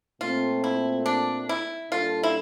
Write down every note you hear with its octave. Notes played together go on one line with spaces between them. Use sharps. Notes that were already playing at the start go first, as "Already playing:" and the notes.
A#2 A3 C4 F4
E4
D4
E4
A#2 G3 D4 F4 A4
E4